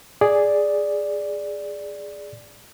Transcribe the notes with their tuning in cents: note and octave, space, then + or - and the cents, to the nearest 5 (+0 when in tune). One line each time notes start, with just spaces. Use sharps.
G#4 +0 D5 +0